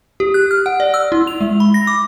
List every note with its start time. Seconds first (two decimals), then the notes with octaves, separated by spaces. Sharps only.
0.20 G4
0.34 F#6
0.51 F6
0.66 F#5
0.80 D5
0.94 E6
1.12 E4
1.27 F7
1.41 G#3
1.60 B5
1.74 A#6
1.87 D6